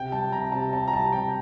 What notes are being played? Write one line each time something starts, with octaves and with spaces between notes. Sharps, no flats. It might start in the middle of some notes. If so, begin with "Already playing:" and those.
Already playing: C3 G5
G3 A5
C3 A#5
C3 A5
C4 A5
A#5
G3 A5
C3 G5